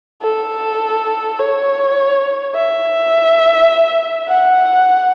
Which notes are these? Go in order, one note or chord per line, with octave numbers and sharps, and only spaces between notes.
A4
C#5
E5
F#5